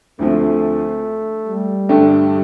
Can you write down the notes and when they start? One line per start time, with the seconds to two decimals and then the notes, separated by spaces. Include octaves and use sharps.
0.19 D2 D3 F3 A3 C4
1.47 G3
1.89 G2 D3 A3 D4 G4